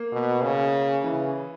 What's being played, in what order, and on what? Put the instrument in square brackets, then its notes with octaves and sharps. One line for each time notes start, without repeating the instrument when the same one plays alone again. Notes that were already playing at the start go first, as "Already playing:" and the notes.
Already playing: [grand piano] A#3
[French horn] B2
C#3
[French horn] C#3 [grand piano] E3